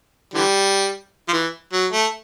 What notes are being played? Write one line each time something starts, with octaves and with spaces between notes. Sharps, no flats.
D3 E3 G3
F3
E3
F#3
A3